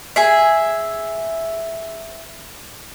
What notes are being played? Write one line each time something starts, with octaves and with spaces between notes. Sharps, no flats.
G#4 E5